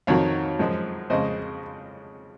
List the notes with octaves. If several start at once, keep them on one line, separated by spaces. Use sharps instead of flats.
F2 D#3 F#3 C#5 F5
F#2 F3 G#3
F2 C#3 G#3 C5 D#5